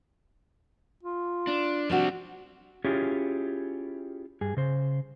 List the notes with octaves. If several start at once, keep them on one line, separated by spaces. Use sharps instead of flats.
F4
D4
F3 G3 C4 D4 F#4
C#4 E4 F4 G4 G#4 C#5
G2 G#4
C#3 C5